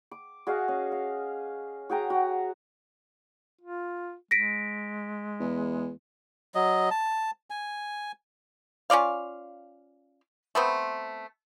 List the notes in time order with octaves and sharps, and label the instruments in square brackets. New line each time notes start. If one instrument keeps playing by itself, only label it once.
[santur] D6
F#4 G#4 D#5 F5
C#4
F5
F#4 G#4 G5 A#5
F#4
[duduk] F4
[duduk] G#3 [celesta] A#6 B6 D7
[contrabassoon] E2
[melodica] F#3 D#5
A5
G#5
[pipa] C#4 F4 D5 F5
A3 B3 C4